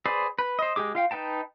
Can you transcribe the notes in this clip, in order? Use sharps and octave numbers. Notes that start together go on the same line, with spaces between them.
G#4 B4 C5 D5
B4
C5 D#5
G#3 G4 G#4 D6
F4 F5 G5
D#4 B4 G5 A5